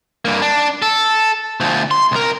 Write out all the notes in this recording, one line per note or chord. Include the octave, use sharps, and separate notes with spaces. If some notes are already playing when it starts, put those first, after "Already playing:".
G2 A#3
D4
A4
D2 F3
C6
C2 A#4